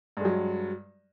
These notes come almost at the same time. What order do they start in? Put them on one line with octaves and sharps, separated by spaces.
G2 G#3 F#3